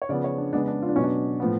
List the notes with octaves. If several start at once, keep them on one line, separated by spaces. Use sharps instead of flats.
C#5
C#3 F3 B3 D5
C#5
D4
C#3 G#3 B3 D4
D4
F4
D4
B2 F#3 B3 C#4
D4
A2 F3 B3